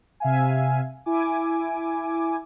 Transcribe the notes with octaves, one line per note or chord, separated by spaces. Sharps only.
C3 E5 F5 G#5
E4 G#5 D6